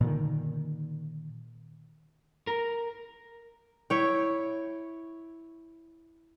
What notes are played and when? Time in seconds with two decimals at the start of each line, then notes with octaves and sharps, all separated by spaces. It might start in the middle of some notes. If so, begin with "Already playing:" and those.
0.01 A#2 D3 D#3
2.47 A#4
3.90 E4 C#5 G5